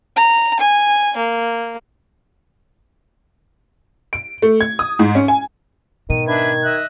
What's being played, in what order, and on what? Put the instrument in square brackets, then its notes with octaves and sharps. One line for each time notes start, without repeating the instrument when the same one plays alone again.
[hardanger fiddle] A#5
G#5
A#3
[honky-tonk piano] D7
A3
G#6
D#6
G#2
C#4
G#5
[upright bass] G#2 B2 [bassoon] D#3 [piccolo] D#7
[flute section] D4 B4 E5 [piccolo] G#6
[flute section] D#5 E5 F#6